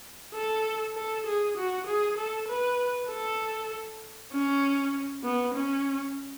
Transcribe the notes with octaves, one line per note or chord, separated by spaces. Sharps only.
A4
A4
G#4
F#4
G#4
A4
B4
A4
C#4
B3
C#4